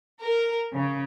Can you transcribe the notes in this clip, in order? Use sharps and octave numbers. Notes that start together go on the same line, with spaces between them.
A#4
C#3